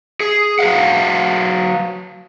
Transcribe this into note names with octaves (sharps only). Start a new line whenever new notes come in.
G#4
F#3 B4 F5 F#5